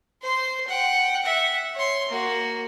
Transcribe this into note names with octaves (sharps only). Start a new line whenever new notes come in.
C5 C6
F#5 G5
E5 F#5
C#5 C6
A#3 F#4